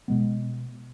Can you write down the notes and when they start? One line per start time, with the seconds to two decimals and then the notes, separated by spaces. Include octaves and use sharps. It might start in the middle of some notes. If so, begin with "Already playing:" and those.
0.08 B2 G#3 B3